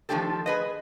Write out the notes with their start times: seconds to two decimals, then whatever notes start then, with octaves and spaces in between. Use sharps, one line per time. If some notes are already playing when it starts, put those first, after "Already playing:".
0.09 D#3 F3 A3 D4 G4 A4
0.46 G#4 B4 D#5